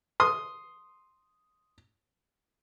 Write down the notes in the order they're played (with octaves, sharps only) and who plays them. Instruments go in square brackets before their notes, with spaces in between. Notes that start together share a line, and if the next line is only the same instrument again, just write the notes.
[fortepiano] C6 D#6